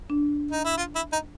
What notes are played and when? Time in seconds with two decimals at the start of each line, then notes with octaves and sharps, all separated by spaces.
0.10 D4
0.51 D#4
0.65 E4
0.78 F4
0.95 E4
1.13 D#4